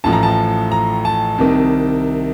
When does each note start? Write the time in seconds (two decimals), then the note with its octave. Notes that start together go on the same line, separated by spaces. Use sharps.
0.04 A1 A2 F3 A5
0.13 A#5
0.23 A5
0.72 A#5
1.05 A5
1.38 C2 C3 D#3